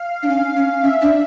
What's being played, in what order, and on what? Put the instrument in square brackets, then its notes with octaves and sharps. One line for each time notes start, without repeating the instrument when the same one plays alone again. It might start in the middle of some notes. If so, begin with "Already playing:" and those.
Already playing: [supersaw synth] F5
[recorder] D4
[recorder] C#4 [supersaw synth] F5
[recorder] C#4
[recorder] C#4 [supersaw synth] E5
[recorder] D4